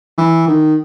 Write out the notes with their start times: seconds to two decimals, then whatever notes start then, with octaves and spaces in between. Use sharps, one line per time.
0.18 E3
0.48 D#3